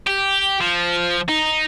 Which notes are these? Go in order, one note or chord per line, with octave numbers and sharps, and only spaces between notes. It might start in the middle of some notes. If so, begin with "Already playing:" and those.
G4
F3
D#4